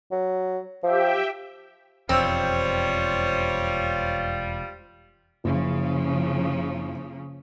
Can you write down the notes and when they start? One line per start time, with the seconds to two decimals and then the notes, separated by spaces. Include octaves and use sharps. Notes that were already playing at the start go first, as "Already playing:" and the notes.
0.12 F#3
0.83 F3 G4 E5 G5
2.09 E1 F2 G3 C4 F4 C5 C#5
5.44 F#1 C#3 F3